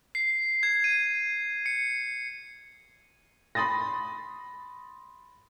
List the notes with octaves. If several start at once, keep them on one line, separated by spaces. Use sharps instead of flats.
C7
G#6
D#7
C#7
B5 C6 D#6 A6 A#6